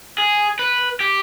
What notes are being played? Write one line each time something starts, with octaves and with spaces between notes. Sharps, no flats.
G#4
B4
G4